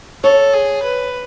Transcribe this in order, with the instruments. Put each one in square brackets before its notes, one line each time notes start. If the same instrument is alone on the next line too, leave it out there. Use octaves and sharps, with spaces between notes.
[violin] A4 [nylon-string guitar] C#5
[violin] G#4
B4